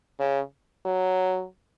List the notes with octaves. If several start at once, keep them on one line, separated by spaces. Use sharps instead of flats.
C#3
F#3